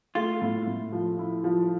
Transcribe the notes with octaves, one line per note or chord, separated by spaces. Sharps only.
A3 F4
A2
A2
F3
E4
F3